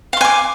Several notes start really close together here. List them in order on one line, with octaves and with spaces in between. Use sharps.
F5 C6 G#5 D6